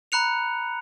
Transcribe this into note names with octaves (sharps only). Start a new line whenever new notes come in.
A#5 B5 F#6 C#7 F7